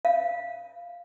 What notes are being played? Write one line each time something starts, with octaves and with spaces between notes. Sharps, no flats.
F5